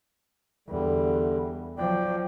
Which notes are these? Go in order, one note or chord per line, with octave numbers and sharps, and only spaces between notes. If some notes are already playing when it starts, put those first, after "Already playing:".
E2 D3 G3
F3 F#3 D5 G5